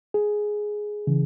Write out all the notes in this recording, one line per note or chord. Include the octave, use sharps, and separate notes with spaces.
G#4
C#3 E3